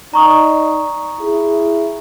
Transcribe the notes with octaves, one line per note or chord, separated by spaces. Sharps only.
D#4 D5 A#5 C#6 D#6
E4 G#4